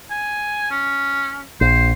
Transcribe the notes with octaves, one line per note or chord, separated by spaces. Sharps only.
G#5
C#4
A#1 C5